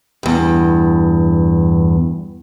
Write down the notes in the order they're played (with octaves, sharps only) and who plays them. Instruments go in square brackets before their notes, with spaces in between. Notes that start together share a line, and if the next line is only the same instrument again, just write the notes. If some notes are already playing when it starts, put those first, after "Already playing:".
[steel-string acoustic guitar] E2 G2